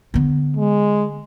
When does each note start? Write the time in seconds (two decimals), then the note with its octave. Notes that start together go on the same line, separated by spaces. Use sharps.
0.14 D3 B3
0.57 G#3